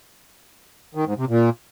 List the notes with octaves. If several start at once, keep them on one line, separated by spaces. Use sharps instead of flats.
D#3
G#2
C3
A#2